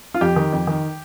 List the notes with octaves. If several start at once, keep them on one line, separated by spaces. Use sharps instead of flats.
F4
F2 G4
D#3
F2
D#3